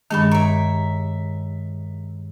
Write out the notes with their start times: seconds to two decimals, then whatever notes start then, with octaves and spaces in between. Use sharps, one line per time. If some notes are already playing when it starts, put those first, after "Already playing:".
0.11 G2 D#3 G#3 D4 G4 A4 A5 C#6
0.32 A#4 C#5 E5